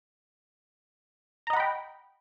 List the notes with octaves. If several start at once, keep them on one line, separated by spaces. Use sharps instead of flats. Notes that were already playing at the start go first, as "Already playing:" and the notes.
D#5 F#5 G5 A#5 B5